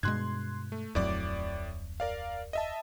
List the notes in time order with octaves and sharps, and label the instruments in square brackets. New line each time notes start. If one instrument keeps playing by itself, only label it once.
[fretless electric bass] G2 B2 G#3 [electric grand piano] C6 F#6 G#6
[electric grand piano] A3
[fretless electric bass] D1 F2 F#3 [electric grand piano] A2 D5 D6
[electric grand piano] A#4 D5 F5
D#5 E5 A5